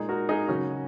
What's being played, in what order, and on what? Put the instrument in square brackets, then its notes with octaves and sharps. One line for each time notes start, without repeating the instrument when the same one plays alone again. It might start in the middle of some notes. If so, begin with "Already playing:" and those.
Already playing: [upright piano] A#2 G#3 D#4 G#4
F#4 A#4
D#4 G#4
C#3 F#3 C#4 F#4